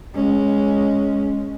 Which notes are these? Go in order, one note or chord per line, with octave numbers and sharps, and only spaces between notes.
G#3 C#4